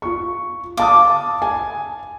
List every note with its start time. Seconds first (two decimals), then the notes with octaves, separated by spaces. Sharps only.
0.02 F4 C#6
0.77 F5 A5 D6 D#6
1.42 G#5